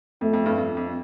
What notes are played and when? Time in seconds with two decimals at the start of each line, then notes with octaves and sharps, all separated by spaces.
0.21 F2 A3
0.33 F2
0.46 G2
0.58 F2
0.77 F2